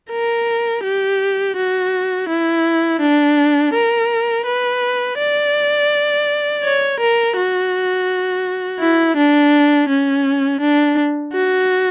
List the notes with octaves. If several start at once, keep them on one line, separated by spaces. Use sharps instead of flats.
A#4
G4
F#4
E4
D4
A#4
B4
D5
C#5
A#4
F#4
E4
D4
C#4
D4
F#4